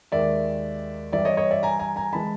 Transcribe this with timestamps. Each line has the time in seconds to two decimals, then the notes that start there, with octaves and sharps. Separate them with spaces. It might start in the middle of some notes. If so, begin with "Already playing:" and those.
0.12 D#2 D#3 G#3 D5 E5
1.13 G2 E3 G3 D5 E5
1.25 C#5 D#5
1.37 C#5 D#5
1.51 D5 E5
1.63 G#5 A#5
1.79 G#5 A#5
1.96 G#5 A#5
2.13 E3 G#3 A5 B5